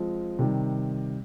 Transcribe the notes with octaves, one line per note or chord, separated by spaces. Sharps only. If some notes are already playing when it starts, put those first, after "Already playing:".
Already playing: F3 G#3 C4 F4
C3 D#3 G3